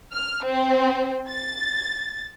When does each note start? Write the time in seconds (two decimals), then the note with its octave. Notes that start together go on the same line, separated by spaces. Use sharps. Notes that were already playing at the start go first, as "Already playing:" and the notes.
0.13 F6
0.45 C4
1.29 A6